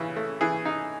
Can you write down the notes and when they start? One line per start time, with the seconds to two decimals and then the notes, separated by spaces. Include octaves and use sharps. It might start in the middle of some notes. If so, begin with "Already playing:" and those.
Already playing: C#3 E3
0.16 A3
0.41 E3 G#4
0.65 D#4